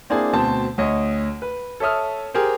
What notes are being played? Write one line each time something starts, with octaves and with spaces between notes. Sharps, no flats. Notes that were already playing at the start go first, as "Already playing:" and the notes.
A#3 C4 D4 E4 G#4
D2 B2 C4 A5
D2 C#5 D#5
B4
A4 C#5 E5 D#6 F6
G4 G#4 A#4 C5